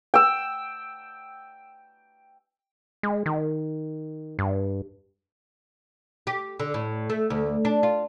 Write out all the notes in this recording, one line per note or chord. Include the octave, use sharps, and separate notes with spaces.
G5 E6
G#3
D#3
G2
G4
D3
A2
A3
D2
D4
F4